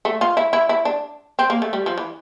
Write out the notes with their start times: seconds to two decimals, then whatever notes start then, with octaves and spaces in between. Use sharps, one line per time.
0.05 A3
0.21 F4
0.37 E4
0.53 E4
0.69 E4
0.85 D4
1.39 C4
1.50 A#3
1.62 A3
1.73 G3
1.86 F3
1.98 E3